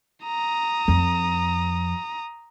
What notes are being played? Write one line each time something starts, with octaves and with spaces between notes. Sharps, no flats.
A#5 D#6
F2